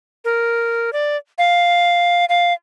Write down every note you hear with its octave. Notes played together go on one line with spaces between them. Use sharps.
A#4
D5
F5
F5